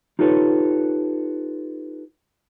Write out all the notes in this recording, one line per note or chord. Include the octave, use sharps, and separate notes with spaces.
D#4 F4 G4 A4 B4 C#5